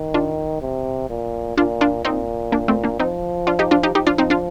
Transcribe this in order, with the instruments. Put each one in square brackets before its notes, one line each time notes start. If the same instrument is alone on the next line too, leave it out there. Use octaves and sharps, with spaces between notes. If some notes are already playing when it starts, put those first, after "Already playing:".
Already playing: [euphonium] D#3
[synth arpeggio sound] D4 F4
[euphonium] C3
A#2
[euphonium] A#2 [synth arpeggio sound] D4 F4
[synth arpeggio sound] D4 F4
[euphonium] A#2 [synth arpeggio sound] C4 D#4
[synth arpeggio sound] A#3 D4
A3 C4
A#3 D4
[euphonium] F3 [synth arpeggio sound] C4 D#4
[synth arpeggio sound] D4 F4
D#4 G4
D4 F4
D#4 G4
[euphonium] F3 [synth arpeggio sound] D#4 G4
[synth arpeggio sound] D4 F4
C4 D#4
D4 F4